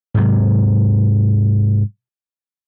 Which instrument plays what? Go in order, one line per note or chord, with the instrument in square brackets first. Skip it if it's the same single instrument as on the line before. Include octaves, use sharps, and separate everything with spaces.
[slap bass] G#2 C3 F#3